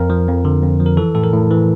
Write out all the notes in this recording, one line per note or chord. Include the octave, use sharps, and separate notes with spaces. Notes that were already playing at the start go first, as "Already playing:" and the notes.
Already playing: F2 A#4
F3
F2
D3
F2
F3
A#4
E3 A4
A2 A4
A#4
A2
E3